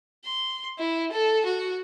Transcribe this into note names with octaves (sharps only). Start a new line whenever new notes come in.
C6
E4
A4
F#4